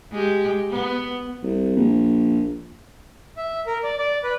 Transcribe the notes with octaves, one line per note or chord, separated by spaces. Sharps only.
G#3 G4
B3
C2
A#1
E5
A#4
D5
D5
B4